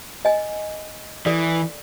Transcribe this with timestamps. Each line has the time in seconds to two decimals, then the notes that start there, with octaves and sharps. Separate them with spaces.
0.25 D#5 G#5
1.26 E3 A4 D5